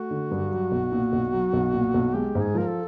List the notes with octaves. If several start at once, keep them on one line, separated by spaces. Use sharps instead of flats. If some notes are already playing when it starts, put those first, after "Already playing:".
Already playing: A3 F#4
D3
G2
F#3
B1
A#2
B1
F#3
B1
A#2
B1
G#3 G4
G#2
G#4
F3 A#4
A4